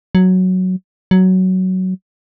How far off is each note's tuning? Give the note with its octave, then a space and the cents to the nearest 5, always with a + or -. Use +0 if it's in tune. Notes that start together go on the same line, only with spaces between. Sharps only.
F#3 +0
F#3 +10